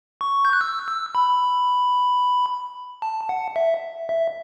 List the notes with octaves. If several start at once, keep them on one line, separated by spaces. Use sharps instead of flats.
C#6
G6
F#6
E6
E6
B5
A5
F#5
E5
E5